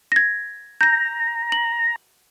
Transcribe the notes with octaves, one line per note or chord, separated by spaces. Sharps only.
G#6 A#6
A#5 G6 A#6
F#7